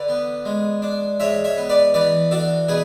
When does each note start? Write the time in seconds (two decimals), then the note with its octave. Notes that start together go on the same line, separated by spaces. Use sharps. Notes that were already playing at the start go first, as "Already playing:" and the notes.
Already playing: D3 B4 D5
0.08 B3
0.45 G#3
0.82 D4
1.20 G#2 C#5 E5
1.44 C#5 E5
1.57 B3
1.70 B4 D5
1.94 E3 B4 D5
2.31 D4 F#4 A4
2.68 B2 G#4 B4